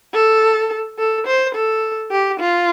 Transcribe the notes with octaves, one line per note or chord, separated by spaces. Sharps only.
A4
A4
C5
A4
G4
F4